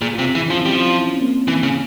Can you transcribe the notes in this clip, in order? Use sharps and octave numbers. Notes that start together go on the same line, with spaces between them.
A#2 F4 G#4
F4 G#4
C3
F4 G#4
E3
E4
F3 C#4
C4 E4
G3
F3
E4
C#4
C4
A#3 C#4
E3
C#3